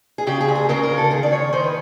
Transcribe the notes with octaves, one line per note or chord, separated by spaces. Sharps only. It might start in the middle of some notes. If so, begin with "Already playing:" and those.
G#4
C#3 G4
G#4
D2
G#4
C#3 A#4
A#4
D2
A4
D#3 G#4
D5
D#3 C#5
D#3 C5
B4